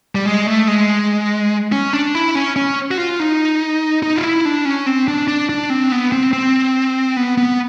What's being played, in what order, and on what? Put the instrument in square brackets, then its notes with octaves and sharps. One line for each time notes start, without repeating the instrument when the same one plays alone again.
[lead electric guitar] G3
G#3
A3
G#3
C#4
D4
E4
C#4
C#4
F#4
F4
D#4
D#4
F4
E4
D4
C#4
C4
D4
D4
D4
C4
B3
C4
C4
B3
B3